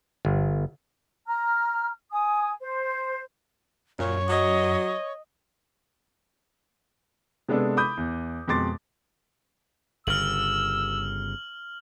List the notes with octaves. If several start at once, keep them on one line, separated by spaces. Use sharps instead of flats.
G1
A#5 F6
G#5 D#6
C5
F#2 A#2 C#5
F#3 D#5
C3 G#3 B3 D4 G#4 A4
B5 D6 D#6 G6
E2
F2 B2 G#3 C6 D6 A6
G1 C#3 E6 F6 F#7